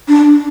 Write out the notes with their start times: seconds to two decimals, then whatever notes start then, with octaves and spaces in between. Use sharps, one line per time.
0.08 D4